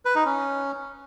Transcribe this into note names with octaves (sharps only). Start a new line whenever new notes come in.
B4
D#4
C#4